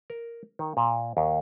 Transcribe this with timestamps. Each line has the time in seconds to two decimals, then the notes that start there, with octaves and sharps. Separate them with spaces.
0.10 A#4
0.59 D#3
0.77 A#2
1.17 D#2